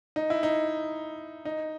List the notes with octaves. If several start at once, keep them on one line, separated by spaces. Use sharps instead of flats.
D#4
E4
D#4
D#4